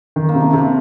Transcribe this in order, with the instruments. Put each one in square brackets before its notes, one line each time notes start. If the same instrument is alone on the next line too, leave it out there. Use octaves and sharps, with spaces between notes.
[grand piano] D#3
[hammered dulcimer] A#3
[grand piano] C3
[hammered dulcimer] A3
[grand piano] C3 [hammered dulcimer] A#3